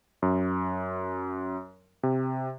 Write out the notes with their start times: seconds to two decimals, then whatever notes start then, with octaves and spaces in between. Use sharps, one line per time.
0.22 F#2
2.03 C3